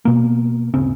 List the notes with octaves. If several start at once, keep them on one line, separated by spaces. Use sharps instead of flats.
B2 A#3
D1 G1 C#3 C4